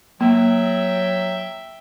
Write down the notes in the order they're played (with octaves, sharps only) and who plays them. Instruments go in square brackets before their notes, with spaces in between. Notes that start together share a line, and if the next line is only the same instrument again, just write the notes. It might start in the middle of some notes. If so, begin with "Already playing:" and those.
[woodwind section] F#3 [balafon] A#3 [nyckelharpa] E5 G5